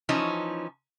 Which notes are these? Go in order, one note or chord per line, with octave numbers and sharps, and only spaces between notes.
E3 F3 C#4 D#4